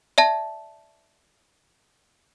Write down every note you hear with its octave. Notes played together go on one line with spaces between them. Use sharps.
D5 E5 A5